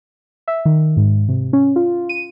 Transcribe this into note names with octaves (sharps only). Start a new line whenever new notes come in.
E5
D#3
G#2
C3
C#4
F4
D#7